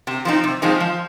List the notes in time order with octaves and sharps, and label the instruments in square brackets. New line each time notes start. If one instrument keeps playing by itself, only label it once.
[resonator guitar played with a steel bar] C3
F3 G#3 C4 D#4
C3
F3 G#3 C4 D#4
F3